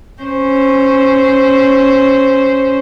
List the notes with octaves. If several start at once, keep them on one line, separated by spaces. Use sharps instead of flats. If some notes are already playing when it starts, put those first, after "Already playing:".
C#4 C5